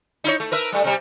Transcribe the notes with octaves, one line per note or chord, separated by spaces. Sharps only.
D#4 E4 C#5
A3
A#4 B4 E5
G3 A3
C3 G3